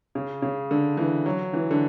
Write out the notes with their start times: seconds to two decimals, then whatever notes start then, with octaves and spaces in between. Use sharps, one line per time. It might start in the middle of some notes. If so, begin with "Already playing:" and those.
0.15 C#3
0.42 C#3
0.71 D3
0.97 E3
1.26 F#3
1.53 E3
1.71 D3